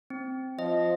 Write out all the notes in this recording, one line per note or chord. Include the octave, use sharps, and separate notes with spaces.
C4
F3 D#5